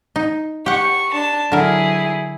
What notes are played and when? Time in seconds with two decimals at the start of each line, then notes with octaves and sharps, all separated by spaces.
0.16 D#4
0.66 G4 F#5 C#6
1.12 D4 A5
1.52 D3 F#3 E4 G#4 A#4